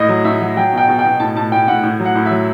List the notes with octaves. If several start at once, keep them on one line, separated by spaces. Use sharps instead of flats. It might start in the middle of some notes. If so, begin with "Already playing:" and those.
Already playing: A2 D#5
F#3
A2 E5
F#3
F#3 G5
B2 G5
B2
G5
B2
A2 A5
A2 A5
A2 G5
A2 F#5
A2
F#3
F#5
A2
E5
F#3